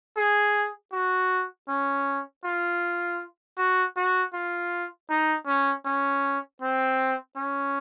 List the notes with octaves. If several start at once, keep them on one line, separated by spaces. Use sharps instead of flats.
G#4
F#4
C#4
F4
F#4
F#4
F4
D#4
C#4
C#4
C4
C#4